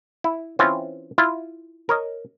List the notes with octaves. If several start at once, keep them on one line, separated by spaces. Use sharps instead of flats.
E4
E3 C4 C#4 F4
E4 F4
A#4 C#5 D#5